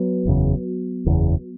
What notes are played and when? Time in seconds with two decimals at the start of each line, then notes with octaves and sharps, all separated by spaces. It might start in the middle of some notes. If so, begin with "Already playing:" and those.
Already playing: F#3 B3
0.25 F#1 E2 C#3
1.06 F#1 E2 C#3